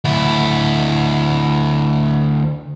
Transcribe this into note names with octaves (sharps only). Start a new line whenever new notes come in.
D2 E4